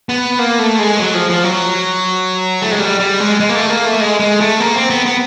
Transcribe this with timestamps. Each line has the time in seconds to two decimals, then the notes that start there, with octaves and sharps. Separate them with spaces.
0.09 B3
0.39 A#3
0.59 A3
0.79 G#3
1.00 F#3
1.14 F3
1.30 F3
1.44 F#3
2.62 A3
2.71 G#3
2.79 G3
3.00 G3
3.20 G#3
3.40 G#3
3.49 A#3
3.55 A3
3.70 A#3
3.85 A3
4.00 G#3
4.20 G#3
4.40 A3
4.60 A#3
4.75 C4
4.90 B3
5.06 B3